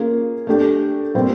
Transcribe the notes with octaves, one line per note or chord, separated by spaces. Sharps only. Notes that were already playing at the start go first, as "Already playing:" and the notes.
Already playing: A#3 C#4 F4 G#4
A3 D4 G4
A#2 G3 C4